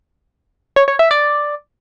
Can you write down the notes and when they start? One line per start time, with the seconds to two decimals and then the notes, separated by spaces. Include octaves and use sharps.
0.76 C#5
0.88 C#5
0.99 E5
1.11 D5